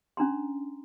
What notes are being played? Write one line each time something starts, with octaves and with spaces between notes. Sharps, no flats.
C#4 D4 A#5 C6